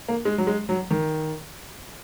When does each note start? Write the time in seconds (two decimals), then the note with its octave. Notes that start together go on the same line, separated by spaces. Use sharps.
0.08 A#3
0.25 G#3
0.38 F#3
0.47 G#3
0.69 F#3
0.91 D#3